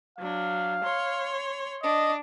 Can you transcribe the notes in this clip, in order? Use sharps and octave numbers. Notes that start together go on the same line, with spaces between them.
F#3 D4 F5
C#5 C6
D4 D#5